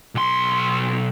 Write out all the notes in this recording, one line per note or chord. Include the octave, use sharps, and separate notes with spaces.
B1 C6